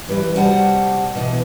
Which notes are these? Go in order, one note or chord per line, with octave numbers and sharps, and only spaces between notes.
E3 G3 E4 B4
C3 G3 F#4 F#5 G#5 A5
B2 E3